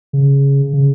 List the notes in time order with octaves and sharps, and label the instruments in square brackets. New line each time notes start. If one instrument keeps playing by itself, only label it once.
[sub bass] C#3
C#3